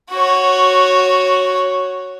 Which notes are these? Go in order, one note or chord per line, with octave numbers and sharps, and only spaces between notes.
F#4 C#5